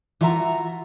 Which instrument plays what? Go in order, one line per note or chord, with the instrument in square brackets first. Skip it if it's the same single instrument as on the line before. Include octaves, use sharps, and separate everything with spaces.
[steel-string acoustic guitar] E3 F4 F#4 E5 F5 A#5